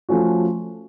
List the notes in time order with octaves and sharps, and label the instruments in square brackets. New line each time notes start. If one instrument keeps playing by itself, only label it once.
[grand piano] F3 A3 C#4 F#4